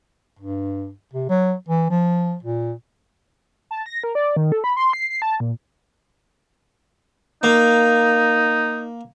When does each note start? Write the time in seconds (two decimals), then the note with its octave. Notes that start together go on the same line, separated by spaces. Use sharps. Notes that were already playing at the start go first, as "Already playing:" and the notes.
0.39 G2
1.14 C3
1.29 F#3
1.69 E3
1.90 F3
2.43 A#2
3.71 A5
3.86 A#6
4.04 A#4
4.15 D5
4.37 D#3
4.52 A4
4.64 B5
4.77 C6
4.93 C7
5.10 C7
5.22 A5
5.40 A#2
7.43 A#3 D#4